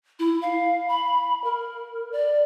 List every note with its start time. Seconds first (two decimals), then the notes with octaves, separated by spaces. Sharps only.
0.19 E4
0.42 F5
0.88 B5
1.44 A#4
2.12 D5